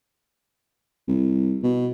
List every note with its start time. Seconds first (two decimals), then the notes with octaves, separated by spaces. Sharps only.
1.08 C2
1.63 B2